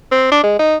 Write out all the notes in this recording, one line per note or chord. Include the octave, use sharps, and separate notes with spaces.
C4
D4
G#3
D#4